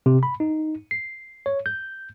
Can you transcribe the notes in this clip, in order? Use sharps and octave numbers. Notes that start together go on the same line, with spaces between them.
C3
B5
D#4
C7
C#5
G6